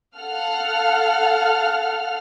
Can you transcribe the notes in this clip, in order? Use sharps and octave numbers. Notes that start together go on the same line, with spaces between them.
A4 F5 F#5 F6